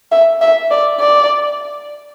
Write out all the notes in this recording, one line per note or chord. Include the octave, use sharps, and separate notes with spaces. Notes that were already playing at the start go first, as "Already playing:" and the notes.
E5
E5
D5
D5